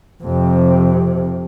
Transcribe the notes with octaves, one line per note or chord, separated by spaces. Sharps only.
F2 C3